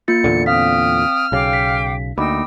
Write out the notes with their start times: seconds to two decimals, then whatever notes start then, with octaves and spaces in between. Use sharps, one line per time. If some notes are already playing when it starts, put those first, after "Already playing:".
0.08 A#3 F4 A6 C#7
0.24 E2 A#2 D3
0.46 C4 F5 G5 D#6 F6 B6
1.32 B1 C#3 F5 G5 D6
1.53 B6
2.18 D2 A#3 D#4 G5 B5 D6 E6